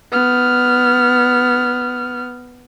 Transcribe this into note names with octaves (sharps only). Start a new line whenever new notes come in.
B3 F6